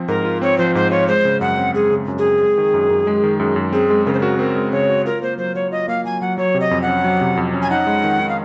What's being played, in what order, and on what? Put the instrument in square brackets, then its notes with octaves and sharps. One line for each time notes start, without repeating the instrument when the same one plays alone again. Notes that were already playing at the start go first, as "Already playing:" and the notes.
Already playing: [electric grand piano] F3 C4
[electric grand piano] G#2 [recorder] A#4
[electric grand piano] F4
[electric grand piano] C4 [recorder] C#5
[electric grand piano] F3 [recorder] C5
[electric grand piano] G#2 [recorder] C5
[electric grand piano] F4 [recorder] C#5
[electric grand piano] G#3 [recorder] C5
[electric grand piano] C#3
[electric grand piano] F#2 [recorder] F#5
[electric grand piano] C4
[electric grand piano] G#3 [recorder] G#4
[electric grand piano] C#3
F#2
[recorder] G#4
[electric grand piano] C4
G#3
D#3
F#2
F#2
G#3
D#3
F#2
F#2
[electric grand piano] C4 [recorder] G#4
[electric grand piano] G#3
[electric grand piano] C#3 [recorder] A#4
[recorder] C5
[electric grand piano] F#4 [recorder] A#4
[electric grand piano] C4 [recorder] A#4
[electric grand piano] G#3
[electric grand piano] C#3 [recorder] C#5
[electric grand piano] F#4
[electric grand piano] F4 [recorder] A#4
[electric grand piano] A#3 [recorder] C5
[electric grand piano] F#3 [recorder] C5
[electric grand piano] F#3 [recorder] C#5
[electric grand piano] F4 [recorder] D#5
[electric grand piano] A#3 [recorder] F5
[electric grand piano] F#3 [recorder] G#5
[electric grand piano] F#3 [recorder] F#5
[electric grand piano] F#3 [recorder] C#5
[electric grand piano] C3
[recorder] D#5
[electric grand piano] F2
[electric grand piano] C#4 [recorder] F#5
[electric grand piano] F#3
C3
F2
C#4
[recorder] G#5
[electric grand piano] D#4 [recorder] F#5
[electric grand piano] G#3
D#3
D#3
[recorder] F5